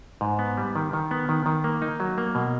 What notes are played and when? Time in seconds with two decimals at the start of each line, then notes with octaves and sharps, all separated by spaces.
0.21 G#2
0.39 B3
0.57 G3
0.76 D#3
0.93 D#3
1.11 B3
1.29 D#3
1.46 D#3
1.64 A#3
1.82 D#4
2.00 F#3
2.18 A#3
2.35 B2